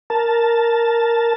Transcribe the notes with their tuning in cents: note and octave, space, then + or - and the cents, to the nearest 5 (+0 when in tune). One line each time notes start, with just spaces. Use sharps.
A#4 +0 A5 +0